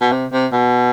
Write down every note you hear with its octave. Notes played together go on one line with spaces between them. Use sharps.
B2
C3
C3
B2